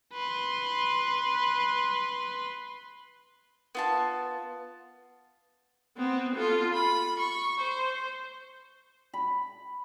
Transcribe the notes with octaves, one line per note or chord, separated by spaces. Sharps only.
B4 C6
B3 F4 A5
B3 C4
F4 A4
B5
C#6
C5
B5